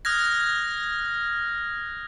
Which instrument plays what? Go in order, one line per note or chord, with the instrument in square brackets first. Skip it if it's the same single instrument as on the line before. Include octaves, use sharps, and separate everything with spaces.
[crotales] D#6 F6 F#6 G#6 A#6